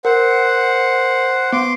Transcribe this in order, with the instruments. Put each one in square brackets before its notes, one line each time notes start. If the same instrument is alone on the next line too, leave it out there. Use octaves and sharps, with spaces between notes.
[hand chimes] A#4 [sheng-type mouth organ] C5 F#5
[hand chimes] B3 [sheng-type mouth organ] C6 D6